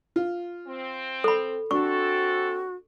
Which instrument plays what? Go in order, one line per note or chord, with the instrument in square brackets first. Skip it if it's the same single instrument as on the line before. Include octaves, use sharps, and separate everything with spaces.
[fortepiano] F4
[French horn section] C4
[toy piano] A4 B5
[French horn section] C4 A4 [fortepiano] D4 [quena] F#4 [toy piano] C#6